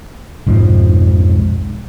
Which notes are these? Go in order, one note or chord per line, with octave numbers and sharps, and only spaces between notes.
B1 F2 G#2 F3